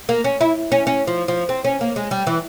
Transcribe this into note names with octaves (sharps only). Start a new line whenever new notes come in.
A#3
C#4
E4
C#4
C#4
F3
F3
C4
C#4
A#3
G#3
G3
E3